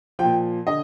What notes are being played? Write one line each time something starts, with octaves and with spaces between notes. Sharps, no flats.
A#2 F3 G5
D3 D#5